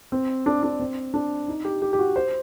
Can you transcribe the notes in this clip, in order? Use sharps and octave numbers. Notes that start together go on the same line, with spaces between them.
C4
D4
D4
C4
D4
D#4
G4
G4
G4
F#4
C5